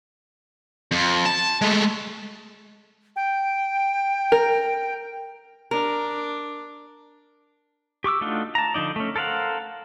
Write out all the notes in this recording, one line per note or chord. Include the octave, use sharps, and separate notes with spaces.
F2
A5
G#3 A3
G5
A#4
D4 A#4
G4 C#6 D6 E6
A3 D4 D#4 F4 F#4
A5 A#5
D3 F3 D#4 D5
A3 C#4
A4 A#4 C5 F5 F#5